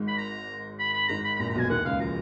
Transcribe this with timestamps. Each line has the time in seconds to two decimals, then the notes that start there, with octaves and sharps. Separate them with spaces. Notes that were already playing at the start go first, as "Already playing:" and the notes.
Already playing: G#1 G#2
0.08 B5
0.18 A#5
0.79 B5
0.94 B5
1.08 G#1 G#2 A#5
1.24 B5
1.36 B5
1.39 A#1 A#2 A#5
1.50 A#5
1.55 B1 B2 G#5
1.70 D#2 D#3 F#5
1.85 C#2 C#3 F5
1.99 F3 A#5